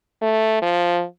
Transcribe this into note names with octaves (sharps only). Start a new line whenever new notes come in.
A3
F3